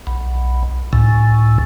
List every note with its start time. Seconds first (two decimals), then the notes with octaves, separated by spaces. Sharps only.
0.07 B1
0.93 C#2 A2